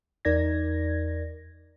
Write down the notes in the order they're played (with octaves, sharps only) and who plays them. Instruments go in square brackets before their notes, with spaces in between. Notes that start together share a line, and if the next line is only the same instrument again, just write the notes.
[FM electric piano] E2 D#4 A#4 D5 G#6 A#6